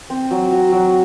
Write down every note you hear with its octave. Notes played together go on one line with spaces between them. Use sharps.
C4
F#3
F#4
F#3